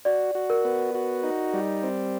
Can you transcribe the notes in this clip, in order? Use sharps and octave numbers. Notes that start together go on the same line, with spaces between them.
F#4 D5
F#4
A#4
B3
F#4
D#4
G3
C4